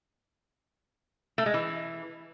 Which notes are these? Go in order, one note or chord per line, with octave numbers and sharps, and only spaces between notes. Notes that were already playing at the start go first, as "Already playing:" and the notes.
A3
G#3
E3